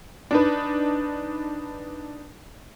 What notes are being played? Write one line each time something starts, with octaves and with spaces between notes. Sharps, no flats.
D4 D#4 B4